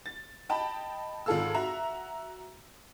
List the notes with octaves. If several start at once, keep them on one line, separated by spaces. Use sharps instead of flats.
A6
D#5 G5 A5 B5
G#1 F4 G#4 A4 F5 E6
F#4 E5 A#5